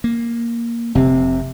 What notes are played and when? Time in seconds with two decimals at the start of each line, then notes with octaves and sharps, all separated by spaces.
0.04 A#3
0.95 F1 C3 C4